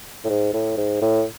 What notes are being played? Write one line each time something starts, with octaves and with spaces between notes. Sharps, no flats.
A2
G#2
A2
G#2
A2